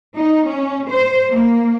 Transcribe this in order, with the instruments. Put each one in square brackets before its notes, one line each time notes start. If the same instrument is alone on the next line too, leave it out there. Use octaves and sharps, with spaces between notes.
[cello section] D#4
C#4
C5
A#3